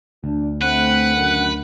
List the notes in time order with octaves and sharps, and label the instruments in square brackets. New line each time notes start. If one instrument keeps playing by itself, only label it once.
[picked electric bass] D2 [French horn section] D4
[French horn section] A3 C4 [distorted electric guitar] B4 [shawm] F#5
[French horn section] F#2 D3 D#3